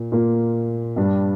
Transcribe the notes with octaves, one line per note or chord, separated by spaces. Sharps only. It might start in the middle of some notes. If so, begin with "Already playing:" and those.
Already playing: A#2 A#3
A#2 A#3 F4
G2 G3 D4